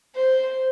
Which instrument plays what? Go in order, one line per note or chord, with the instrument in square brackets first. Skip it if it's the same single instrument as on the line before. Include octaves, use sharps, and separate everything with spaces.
[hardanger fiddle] C5